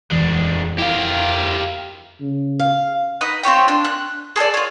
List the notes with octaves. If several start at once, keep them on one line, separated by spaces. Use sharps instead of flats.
D#1 F2 E3 G#3 D4
E4 G4 A#4 F5
C#3
F5
D#4 B4 D#5
C4 F4 C#5 G5
D4
F#6
G#4 A4 C5 D5
F4 C#5